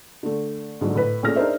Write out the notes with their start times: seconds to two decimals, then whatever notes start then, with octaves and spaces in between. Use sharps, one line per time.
0.23 D3 A3
0.81 G#2 D3 F#3 A3
0.95 A2 B4
1.23 A#2 A3 C#4 G#4 F6 A#6
1.36 D4 D#4 G#4 A#4 C5 E5